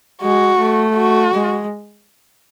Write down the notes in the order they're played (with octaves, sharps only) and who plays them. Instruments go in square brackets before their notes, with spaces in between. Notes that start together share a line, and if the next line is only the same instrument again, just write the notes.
[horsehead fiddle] G#3 [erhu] F#4
[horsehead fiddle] A3
[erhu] F#4
[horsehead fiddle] G#3